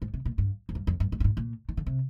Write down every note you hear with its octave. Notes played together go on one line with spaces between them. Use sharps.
G#2
C3
A#2
G2
F2
G2
F2
G2
G#2
G2
G#2
A#2
D#3
D3
C3